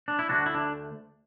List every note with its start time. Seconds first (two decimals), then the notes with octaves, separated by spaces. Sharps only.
0.08 D4
0.19 E4
0.29 D2 D3 A3 D4 F#4
0.46 E4
0.54 D4